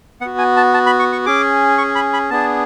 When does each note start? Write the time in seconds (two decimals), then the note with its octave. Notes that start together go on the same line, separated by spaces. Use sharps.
0.21 B3 F#5
0.26 F#4
0.38 G#5
0.57 A5
0.74 A5
0.86 B5
0.99 C#6
1.12 C#6
1.26 C#4 G#4 D6
1.78 C#6
1.95 B5
2.13 B5
2.30 B3 D4 G#4 A5